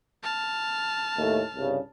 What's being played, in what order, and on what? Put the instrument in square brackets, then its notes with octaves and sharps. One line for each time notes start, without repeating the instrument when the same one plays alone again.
[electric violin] A5 F6
[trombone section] D#2 A2 A3
C2 G2 C#3